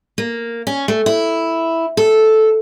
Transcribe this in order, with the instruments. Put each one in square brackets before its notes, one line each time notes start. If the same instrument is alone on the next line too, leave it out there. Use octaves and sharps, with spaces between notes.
[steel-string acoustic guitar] A#3
C#4
A3
E4
A4